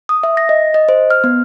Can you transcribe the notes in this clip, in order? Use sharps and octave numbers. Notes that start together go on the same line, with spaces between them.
D#6
E5
A#6
D#5
D#5
C5
F6
B3